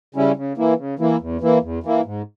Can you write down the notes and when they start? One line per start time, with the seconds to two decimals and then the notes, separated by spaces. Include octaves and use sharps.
0.15 C#3 G3 C#4 E4
0.36 C#3
0.57 E3 A#3 E4
0.78 C#3
0.99 E3 A#3 E4
1.20 E2
1.41 E3 A#3 E4
1.62 E2
1.83 E3 A#3 E4
2.05 G#2